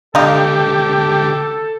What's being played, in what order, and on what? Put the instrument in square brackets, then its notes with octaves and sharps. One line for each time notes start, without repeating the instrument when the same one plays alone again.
[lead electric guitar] C#2 D3 [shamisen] D4 D#4 F5 [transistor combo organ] G4 [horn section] A4